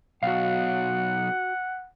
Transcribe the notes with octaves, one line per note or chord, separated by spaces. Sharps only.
B1 F#4 F5 F#5